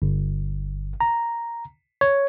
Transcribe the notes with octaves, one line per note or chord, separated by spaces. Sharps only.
G1
A#5
C#5